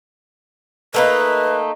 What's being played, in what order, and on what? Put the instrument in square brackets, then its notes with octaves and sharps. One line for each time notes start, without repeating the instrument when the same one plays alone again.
[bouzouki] A3 A#3 D#4 [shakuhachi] B4